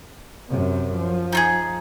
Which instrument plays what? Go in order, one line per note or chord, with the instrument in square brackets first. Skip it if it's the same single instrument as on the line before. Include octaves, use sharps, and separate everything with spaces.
[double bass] F#2 C3
F3
[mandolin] D#4 F4 G#4